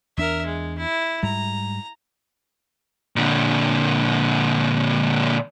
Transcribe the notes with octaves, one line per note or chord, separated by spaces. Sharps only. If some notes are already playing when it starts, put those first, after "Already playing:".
E2 D4 A#4 E5
G#3
E4
G#2 G3 A#5
A#2 D3